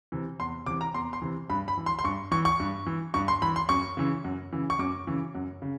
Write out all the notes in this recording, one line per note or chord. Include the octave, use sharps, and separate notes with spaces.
C3 E3
E2 C6
C3 E3 D6
A#5
E2 C6
C6
C3 E3
G2 B5
B5
E3
C6
C6
G2 C#6
E3 C#6
C#6
G2
E3
G2 C#6
C6
E3 B5
C6
F#2 C#6
C#3 E3
F#2
C#3 E3
C#6
F#2 D6
C#3 E3
F#2
C#3